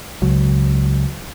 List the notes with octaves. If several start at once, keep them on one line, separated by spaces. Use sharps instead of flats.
C#2 F#3